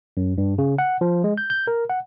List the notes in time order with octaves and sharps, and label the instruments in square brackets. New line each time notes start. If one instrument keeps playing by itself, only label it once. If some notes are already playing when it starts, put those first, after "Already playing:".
[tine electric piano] F#2
G2
C#3
F#5
F3
G#3
G6
G6
A#4
F#5